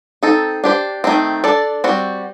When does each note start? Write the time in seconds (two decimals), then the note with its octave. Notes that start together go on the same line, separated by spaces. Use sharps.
0.23 C4 D#4 A4
0.64 D4 G4 C5
1.04 D#3 A3 C4
1.44 D4 A4 D5
1.84 G3 C4 F#4